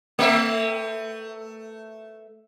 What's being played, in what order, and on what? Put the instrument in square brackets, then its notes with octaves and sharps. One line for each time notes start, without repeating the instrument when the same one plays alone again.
[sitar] A3 E5